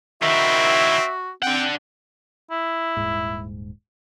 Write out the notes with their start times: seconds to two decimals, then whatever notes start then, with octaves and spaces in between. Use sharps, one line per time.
0.22 D#3 C4 E4 F#4 E5
1.42 C4 D4 F#5 G5
2.51 E4
2.97 D#1 G#2